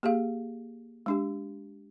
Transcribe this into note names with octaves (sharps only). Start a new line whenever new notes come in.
A#3 G4 G#4 F5
G#3 D4 G4